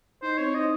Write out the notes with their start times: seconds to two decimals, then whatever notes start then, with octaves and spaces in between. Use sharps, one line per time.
0.22 D#4 C5
0.38 C4 C#5
0.54 D#4 D#5